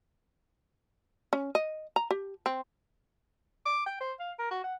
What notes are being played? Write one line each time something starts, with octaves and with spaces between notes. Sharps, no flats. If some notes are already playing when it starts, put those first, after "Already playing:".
C#4
D#5
A#5
G4
C4
D6
G5
C5
F5
A#4
F#4
F#5